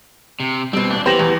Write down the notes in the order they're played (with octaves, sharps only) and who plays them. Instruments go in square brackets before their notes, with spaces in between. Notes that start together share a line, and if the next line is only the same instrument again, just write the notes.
[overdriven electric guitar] C3
[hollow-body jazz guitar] G2 B2 [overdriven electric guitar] C4
[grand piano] D#1 [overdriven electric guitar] D4
[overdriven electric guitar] E3 [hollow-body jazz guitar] B3 G4 [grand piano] C5 A#6 F#7
[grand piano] E2